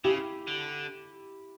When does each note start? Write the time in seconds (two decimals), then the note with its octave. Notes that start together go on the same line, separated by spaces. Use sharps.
0.04 C#3 E4 G4
0.47 D3